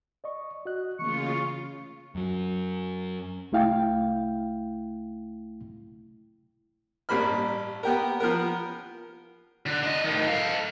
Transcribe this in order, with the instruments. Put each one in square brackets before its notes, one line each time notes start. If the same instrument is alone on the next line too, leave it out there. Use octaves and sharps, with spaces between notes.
[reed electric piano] D5 D#5 C#6
F#4 D#5 F#6
[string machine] C#3 F4 [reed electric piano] E3 A3 A#3 [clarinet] C#6
[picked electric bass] F#2 F#3
[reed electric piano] C2 A3 E4 F5 G5
[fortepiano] A1 G2 A#3 B5 F6
B3 G4 A#4
F3 B3 A#4
[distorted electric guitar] D3
D4 D#5
A2 D#3
A4 F5